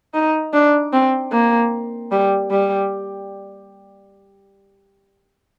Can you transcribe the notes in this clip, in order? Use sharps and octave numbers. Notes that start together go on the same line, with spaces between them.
D#4
D4
C4
A#3
G3
G3